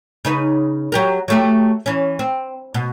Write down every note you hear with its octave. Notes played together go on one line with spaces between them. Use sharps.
C#3 D#4 B4
F#3 G4 A#4
F#3 A3 G4
E3 C#4
C4
B2